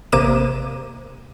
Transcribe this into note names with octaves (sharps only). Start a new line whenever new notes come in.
A1 C3 A#3 D6 D#7 E7